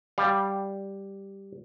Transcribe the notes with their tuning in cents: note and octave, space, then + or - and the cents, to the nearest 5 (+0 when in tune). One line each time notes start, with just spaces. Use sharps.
G3 +0 F5 +10